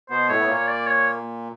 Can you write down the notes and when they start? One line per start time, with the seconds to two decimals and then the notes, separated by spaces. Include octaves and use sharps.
0.10 B2 B3 C5
0.29 A2 A3 C#5
0.39 B3
0.48 A#2 A#3
0.55 C#5
0.68 D5
0.86 C#5